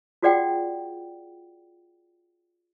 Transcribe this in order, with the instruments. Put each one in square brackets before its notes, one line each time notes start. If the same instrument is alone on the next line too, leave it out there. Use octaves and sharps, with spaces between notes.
[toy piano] F4 F#4 G#4 D5 F#5 G5